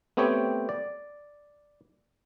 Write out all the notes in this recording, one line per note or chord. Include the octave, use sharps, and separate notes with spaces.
A3 B3 C4 G4 C#5 G5
D5